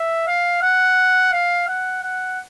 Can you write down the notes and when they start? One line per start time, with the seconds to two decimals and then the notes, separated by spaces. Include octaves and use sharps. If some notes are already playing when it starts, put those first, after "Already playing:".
Already playing: E5
0.27 F5
0.62 F#5
1.32 F5
1.68 F#5
2.03 F#5